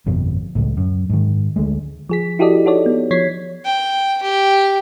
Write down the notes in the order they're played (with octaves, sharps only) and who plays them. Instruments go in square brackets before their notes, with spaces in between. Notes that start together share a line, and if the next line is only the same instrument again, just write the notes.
[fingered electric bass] G1 F2 B2
C#2 A2
F#2
G#2 D#3
D2 G#3 A3
[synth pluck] F3 G#4 B6
E4 F#4 G4 A4 D5 D#5
D#4 F#4 A4 C#5 D5
B3
F3 C#5 G#6 B6 C7
[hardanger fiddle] G5
G4